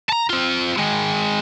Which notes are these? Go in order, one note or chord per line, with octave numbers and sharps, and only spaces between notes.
A5 A#5
C4 F4
D#3 G#3